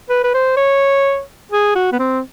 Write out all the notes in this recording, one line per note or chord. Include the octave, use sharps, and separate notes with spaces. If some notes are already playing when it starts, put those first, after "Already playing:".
B4
B4
C5
C#5
G#4
F#4
B3
C4